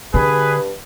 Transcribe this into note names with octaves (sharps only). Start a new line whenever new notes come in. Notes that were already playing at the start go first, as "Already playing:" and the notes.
G2 D3 G#4 B4